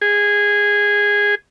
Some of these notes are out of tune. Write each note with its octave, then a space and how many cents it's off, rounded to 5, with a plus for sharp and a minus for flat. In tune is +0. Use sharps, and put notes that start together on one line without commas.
G#4 -15